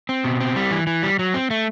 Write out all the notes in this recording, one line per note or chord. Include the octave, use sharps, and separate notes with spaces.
C4
B2
C4
G3
E3
E3
G3
F#3
C4
A3